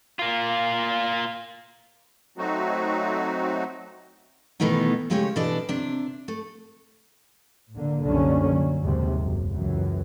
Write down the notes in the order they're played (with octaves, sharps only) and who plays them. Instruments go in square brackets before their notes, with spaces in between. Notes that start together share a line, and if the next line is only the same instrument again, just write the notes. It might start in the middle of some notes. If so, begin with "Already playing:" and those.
[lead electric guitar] A#3 F4
[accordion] F#3 A3 C4 D#4 F#4
[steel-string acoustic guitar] B2 D#3 E3 A3 B3 D#4
C#3 F3 G#3 A3 G4 C#5
B2 E3 D4 A4 D5 D#5
C3 D4
A3
[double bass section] A2 D3 A#3
C2 F#2 D3 D#3 A#3 C#4
F#3
D#2 G#2 C3
F#1 F#2
C#2 F#2 E3